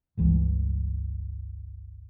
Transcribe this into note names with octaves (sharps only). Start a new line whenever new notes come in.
G1 C#2 E3